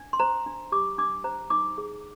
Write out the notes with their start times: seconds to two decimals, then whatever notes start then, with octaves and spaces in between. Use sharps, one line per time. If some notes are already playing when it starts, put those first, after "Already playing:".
Already playing: D4
0.13 C6
0.20 C5 A#5
0.46 D4
0.72 G4 D6
0.98 D4 D6
1.24 C5 A#5
1.50 D#4 D6
1.78 G#4